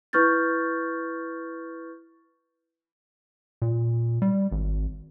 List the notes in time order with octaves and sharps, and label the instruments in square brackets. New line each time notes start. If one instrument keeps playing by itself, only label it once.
[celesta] E4 B4 C#6 F6 G6 A6
[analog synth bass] A#2
G3
G#1